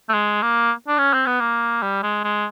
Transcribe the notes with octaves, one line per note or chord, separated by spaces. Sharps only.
A3
G#3
A#3
D4
C#4
C4
B3
A#3
G3
G#3
G#3